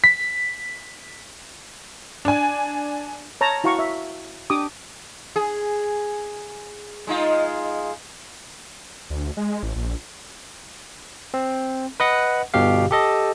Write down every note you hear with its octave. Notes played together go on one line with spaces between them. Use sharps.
B6
D4 G#5
C#5 A5 A#5
E4 F#4 F5 A#5 C#6
E5
D4 G4 D6 D#6
G#4
G#3 D#4 F4
D2
G#3
A1
A#1
C4
B4 D#5 F#5
G1 B2 G4 F5
G4 A4 D#5